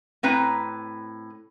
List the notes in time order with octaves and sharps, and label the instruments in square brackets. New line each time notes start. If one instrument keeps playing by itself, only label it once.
[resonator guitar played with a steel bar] A2 C4 B4 A#5